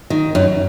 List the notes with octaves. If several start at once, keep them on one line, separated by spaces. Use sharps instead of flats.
D#3
F#2